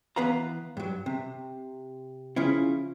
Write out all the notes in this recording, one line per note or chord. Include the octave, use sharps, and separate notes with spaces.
E3 B3 B4 F5 A#5
G2 F#3
C3
C#3 F3 C#4 E4